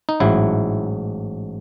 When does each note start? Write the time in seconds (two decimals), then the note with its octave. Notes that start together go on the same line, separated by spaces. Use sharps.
0.09 D#4
0.20 A1 G#2 F#3 E4